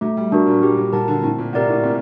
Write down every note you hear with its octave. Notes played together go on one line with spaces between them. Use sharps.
F#3 A3
G3
F#3 D4 F#4 A#4
A#2
G3 G4
F#3
F#3 A#4 F#5 A5
D3
A2 C4
A#2
C3 G4 A#4 D5 F#5
A2
A#2 C4